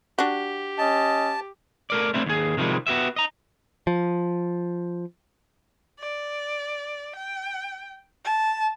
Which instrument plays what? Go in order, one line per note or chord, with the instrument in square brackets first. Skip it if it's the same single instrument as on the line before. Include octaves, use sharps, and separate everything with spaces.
[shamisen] D4 F#4 [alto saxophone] G4
[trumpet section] C#4 D#5 [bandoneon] A5
[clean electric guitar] A3 A#4 D5
G3 A3 C4 D4 E4
D#2 G#4
C3 D#3 F3 G3 G#3
B3 F#4 G4 E5
D#5 A#5
[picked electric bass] F3
[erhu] D5
G5
A5